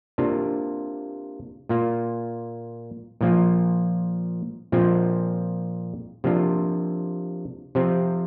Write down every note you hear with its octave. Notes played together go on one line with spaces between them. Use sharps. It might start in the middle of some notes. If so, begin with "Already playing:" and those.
C3 A#3 D4 F4
A#2 A#3 F4
A#2 F3 A#3 F4
A#2 F3 C4 F4
C3 F3 A#3 D4 F4
C3 F3 C4 F4